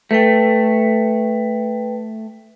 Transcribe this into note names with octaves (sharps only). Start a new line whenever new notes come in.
A3 B4 G5